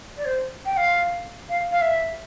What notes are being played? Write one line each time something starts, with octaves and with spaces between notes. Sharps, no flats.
D5
C5
G5
F5
F5
F5
E5